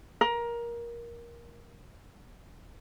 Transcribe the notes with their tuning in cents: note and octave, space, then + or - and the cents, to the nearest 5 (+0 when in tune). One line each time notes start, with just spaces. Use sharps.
A#4 +15